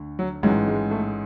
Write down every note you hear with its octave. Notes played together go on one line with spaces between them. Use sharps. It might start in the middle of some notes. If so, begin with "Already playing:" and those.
Already playing: D2 D3
F#3
A1 G#2 E3 F#3
G#3
A3